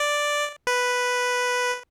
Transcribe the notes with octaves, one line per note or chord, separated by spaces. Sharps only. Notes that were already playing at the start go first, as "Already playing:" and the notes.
Already playing: D5
B4